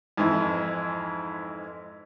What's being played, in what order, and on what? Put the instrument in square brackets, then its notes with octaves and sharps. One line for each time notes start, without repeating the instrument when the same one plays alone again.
[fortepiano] F2 G#2 E3